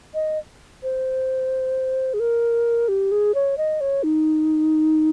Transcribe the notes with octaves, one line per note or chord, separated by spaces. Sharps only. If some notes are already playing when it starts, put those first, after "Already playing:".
D#5
C5
G#4
A#4
G4
G#4
C#5
D#5
C#5
D#4